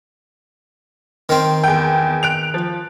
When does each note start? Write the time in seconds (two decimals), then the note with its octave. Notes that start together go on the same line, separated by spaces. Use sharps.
1.29 D#3 C4
1.64 E2 G5
2.23 F#6 D7 F7
2.54 F3